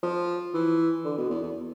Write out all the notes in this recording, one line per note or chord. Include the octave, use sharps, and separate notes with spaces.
F3
E3
D3
B2
E2
E2